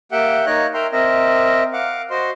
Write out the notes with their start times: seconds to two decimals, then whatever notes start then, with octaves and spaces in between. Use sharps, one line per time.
0.12 A#3 G4 E5 F#5 G5
0.46 A#3 D#4 C#5 D#5 F#6
0.74 A#4 E5 G5 A#5 C6
0.92 C4 A#4 D#5 E5
1.73 F5 F#5 D6
2.10 F#4 C5 D#5 C6